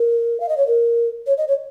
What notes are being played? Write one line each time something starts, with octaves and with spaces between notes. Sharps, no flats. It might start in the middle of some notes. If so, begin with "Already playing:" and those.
Already playing: A#4
F5
D#5
C#5
A#4
C#5
D#5
C#5